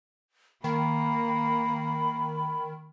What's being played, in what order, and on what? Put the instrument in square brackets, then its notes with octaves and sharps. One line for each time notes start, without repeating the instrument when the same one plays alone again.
[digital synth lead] D#3 [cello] A#3 [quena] B5